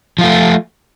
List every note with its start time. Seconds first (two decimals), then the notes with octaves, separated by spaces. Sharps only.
0.18 F3
0.21 F4
0.24 A3